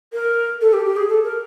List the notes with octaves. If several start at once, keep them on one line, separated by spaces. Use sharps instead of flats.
A#4
A4
G4
G4
G#4
A4
A#4